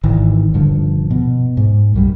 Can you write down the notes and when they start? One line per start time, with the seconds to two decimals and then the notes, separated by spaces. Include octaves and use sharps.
0.03 G#1 D#3 E3
0.54 D#1 G2 D3 F3
1.11 B2
1.57 G#2
1.94 B1 F#2 G3